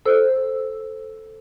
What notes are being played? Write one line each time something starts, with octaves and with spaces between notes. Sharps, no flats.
A4 C5 E6